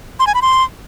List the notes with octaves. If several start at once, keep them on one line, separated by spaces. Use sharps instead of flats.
C6
G#5
B5
C6